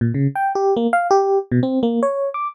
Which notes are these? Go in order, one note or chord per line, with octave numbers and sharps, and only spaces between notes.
A#2
C#3
G5
G4
A#3
F5
G4
B2
C4
A#3
C#5
D6